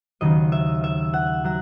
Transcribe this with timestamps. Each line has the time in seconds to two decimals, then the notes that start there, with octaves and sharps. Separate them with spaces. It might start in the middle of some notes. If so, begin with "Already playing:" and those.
0.21 D#2 C#3 F#3 D#5
0.52 E5
0.84 E5
1.14 F#5
1.44 F#3 F#5